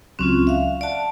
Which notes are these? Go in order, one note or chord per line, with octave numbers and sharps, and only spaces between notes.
C#2 F#3 C4 C#4 F4 F#6
E5 F5
D5 F5 F#5 A5